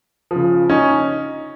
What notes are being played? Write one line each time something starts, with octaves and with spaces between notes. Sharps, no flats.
C#3 F3
C#4 D#4